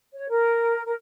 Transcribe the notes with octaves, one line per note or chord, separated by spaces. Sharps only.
C#5
A#4
A#4